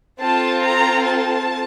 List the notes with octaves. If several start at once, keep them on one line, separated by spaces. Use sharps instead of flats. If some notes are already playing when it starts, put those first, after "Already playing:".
C4 F4 A4 A5
A#5
A5